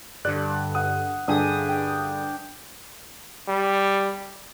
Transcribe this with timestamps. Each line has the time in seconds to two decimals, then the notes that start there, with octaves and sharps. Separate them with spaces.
0.25 G2 D3 D5 F#6
0.75 F#5 D#6
1.28 G2 D3 D4 G4 G#4 D#6
1.69 G5
3.48 G3